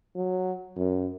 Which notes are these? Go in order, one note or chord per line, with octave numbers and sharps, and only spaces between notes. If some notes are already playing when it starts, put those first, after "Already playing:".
F#3
F#2